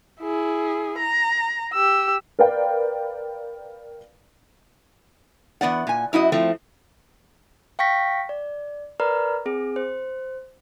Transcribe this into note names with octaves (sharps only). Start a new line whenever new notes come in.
E4 G#4
A#5
G4 E6
A#4 B4 D5 F5 G5
E2 B3 D5 F#5
A#2 G#5
F#2 E4 F#4 D#5
F3 A3 C4
F5 G5 C#6 A#6 B6
D5
A#4 B4 D5 A#5 B5 F6
C4 G#4
C5